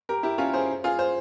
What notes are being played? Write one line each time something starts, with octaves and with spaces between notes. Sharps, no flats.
G4 A#4
E4 G4
C#4 F4
G#4 C5
F4 G#4
C5